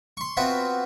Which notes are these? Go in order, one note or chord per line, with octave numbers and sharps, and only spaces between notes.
C6 C#6
B3 C4 F4 F#4 E5